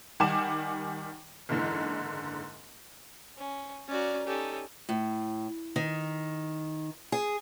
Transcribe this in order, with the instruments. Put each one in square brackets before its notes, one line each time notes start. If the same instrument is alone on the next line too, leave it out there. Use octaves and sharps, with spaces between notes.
[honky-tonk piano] D#3 G3 F#5 G#5 D6 E7
F#1 G#2 D3 E3
[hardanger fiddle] C#4
[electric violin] C#4 F#4 [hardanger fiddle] A#4 D5
[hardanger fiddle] C#4 D#4 [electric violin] G4 A4
[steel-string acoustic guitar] A2
D#3
G#4